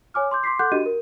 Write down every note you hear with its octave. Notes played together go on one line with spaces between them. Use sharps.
C#5 G#5 D6 F6
C6 D6 G6
C6 D6 B6 C7
A4 F#5 C6 D6 F#6 G6
D4 F#4 G4 D#5 D#7
A#4